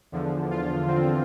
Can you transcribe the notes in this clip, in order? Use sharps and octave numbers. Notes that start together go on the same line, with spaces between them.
E2 D3 F3
F4
C4